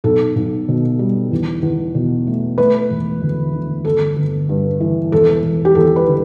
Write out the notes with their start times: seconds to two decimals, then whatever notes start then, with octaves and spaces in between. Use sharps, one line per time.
0.04 B1 A4
0.36 B1
0.68 B2
0.99 G3
1.31 E2
1.62 E2
1.95 B2
2.27 A3
2.58 A3 B4
2.90 E1
3.22 D2
3.53 D3
3.85 G1 A4
4.16 G1
4.49 G2
4.80 E3
5.12 E1 A4
5.44 E1
5.65 G4
5.75 E2 A4
5.96 B4
6.07 D3